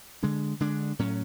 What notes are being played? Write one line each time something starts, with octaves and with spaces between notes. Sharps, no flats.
D3 G#3 D4
D3 G#3 D4
A2 F#3 C#4